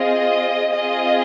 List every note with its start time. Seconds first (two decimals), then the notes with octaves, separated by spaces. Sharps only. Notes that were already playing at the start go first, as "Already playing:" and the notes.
Already playing: C4 F4 G#4 D#5
0.75 C4 F4 G#4 D#5